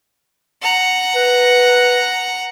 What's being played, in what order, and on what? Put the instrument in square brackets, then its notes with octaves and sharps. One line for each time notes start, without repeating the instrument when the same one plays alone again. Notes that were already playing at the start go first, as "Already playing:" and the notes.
[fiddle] F#5 A#5
[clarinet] B4